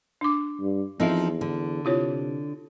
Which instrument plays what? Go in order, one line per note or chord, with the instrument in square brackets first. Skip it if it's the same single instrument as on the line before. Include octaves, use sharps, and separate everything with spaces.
[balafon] D4 D6
[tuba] G2
[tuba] E2 [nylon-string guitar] F3 C4 D#4 [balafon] A4 E5
[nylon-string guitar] D3
[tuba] C3 [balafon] E4 F4 C#5